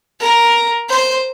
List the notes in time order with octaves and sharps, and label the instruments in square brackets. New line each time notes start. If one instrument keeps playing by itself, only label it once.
[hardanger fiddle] A#4
C5